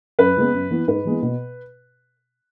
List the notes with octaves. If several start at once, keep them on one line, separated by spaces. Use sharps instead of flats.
F#2 B4
C#3 G#3 B3
F#2
E3 B3
G#2 B4
E3 G#3 B3
B2